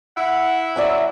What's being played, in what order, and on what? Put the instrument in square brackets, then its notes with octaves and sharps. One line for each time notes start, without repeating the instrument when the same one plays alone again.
[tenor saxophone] E4 [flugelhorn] F#5
[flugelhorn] F#3 [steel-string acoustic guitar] D5 E5 G#5